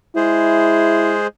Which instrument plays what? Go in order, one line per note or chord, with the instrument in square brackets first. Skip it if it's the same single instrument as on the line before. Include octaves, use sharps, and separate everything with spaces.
[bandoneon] G#3 G#4 C5 [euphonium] E4